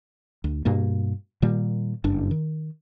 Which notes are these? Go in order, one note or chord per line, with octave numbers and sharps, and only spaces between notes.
D2
G2 B2 A#3
A#2 D#3 G3 A#3
F#1 G2 D4
D#3